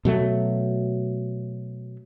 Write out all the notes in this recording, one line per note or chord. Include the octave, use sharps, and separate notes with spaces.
B2 F#3 A3